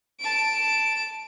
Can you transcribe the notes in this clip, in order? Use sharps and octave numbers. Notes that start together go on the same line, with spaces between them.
A5 D7